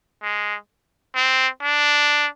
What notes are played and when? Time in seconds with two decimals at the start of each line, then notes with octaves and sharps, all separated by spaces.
0.23 G#3
1.15 C4
1.62 D4